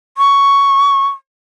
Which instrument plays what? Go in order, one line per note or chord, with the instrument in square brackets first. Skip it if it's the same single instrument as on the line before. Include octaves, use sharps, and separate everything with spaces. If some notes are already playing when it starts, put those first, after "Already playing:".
[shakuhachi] C#6